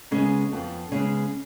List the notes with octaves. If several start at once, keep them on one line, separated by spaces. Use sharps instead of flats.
C#3 G#3 B3 C#4
F2 F3 B3
C#3 G#3 B3 C#4